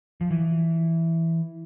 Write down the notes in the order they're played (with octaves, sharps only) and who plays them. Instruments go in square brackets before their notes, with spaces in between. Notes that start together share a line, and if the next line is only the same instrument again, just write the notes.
[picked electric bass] F3
E3